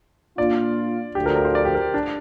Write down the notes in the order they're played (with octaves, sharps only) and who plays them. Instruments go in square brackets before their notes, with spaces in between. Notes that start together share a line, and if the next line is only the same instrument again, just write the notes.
[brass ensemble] A#2 A#3 D4 F4 [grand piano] D5
[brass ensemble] D2 D3 F3 [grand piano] G4
[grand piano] A#4
A#4
C5
D5
G4
A#4
D4